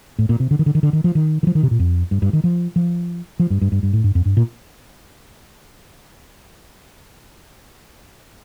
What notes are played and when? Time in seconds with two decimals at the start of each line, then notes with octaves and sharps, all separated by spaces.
0.19 A2
0.29 A#2
0.40 C3
0.51 D3
0.59 D#3
0.66 D3
0.75 D#3
0.83 D3
0.93 D#3
1.04 F3
1.15 D#3
1.43 D#3
1.47 F3
1.55 D#3
1.63 C3
1.71 A#2
1.79 F2
2.11 G2
2.22 G2
2.33 D#3
2.44 F3
2.76 F3
3.40 F3
3.50 G2
3.61 G2
3.72 G2
3.83 G2
3.93 A2
4.04 G2
4.15 F2
4.25 G2
4.37 A#2